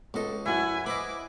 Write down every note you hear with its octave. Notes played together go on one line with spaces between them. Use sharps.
C#2 B3 F4 A4 D#5
F#2 E4 F#4 F#5 G#5
B4 C5 D#5 B5 D6